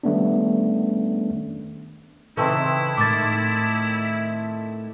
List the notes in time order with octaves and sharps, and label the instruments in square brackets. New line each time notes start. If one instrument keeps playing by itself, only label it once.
[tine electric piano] D#3 G3 A3 B3 C#4 D4
[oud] C#3 E3 [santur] A3 C4 D#4 [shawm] E4
[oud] A2 D#3 [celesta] D6 A6